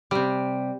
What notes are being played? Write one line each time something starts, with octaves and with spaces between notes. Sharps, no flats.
C3 G3